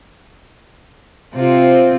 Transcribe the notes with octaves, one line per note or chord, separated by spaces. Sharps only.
C3 C4 F4